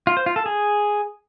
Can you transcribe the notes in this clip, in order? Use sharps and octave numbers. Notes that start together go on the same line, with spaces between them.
F4
C5
F4
A4
G#4